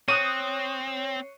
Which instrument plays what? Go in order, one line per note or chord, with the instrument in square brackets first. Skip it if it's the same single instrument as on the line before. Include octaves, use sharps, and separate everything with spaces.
[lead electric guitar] C4 [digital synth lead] C#5 [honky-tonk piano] C#6 D#6 F#6 [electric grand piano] D#7